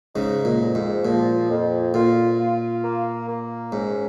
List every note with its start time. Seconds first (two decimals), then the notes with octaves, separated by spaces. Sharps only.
0.15 G#2 C#3 D#4
0.45 A#2
0.60 F2
0.75 G#2
1.05 A#2 F3
1.49 F2
1.93 A#2 F4
2.39 F4
2.84 A#3
3.28 A#3
3.72 G#2 C#4